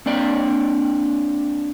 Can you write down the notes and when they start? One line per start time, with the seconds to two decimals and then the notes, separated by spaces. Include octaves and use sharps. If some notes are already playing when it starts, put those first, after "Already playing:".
0.06 A#3 C4 D4 D5 G5